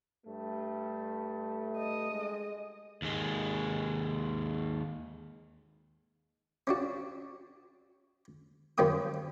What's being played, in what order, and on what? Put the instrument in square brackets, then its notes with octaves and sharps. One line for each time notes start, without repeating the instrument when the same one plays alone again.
[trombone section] G2 A3
[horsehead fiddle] D#5
[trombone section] G#3
[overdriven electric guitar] D#2 G#3
[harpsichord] C#4 D4 F#4
F#2 D#3 B3 C#4 G5 D#6